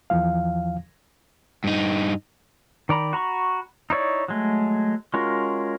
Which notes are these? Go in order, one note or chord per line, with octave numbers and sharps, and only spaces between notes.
E2 E3 F3 F5
G2 D#4
D#3 D5 A#5 B5
F#4 A#5 B5 C#6
D#4 E4 C#5 D5
F#3 G#3 A3
G#3 C#4 F4 F#4 A#4